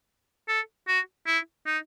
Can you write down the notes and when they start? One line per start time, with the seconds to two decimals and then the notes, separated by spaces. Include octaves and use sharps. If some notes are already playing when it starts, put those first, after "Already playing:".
0.49 A4
0.88 F#4
1.27 E4
1.66 D#4